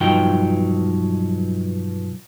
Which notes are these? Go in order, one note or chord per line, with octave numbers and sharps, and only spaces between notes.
B1 G2 F3 F#3 D#4 G5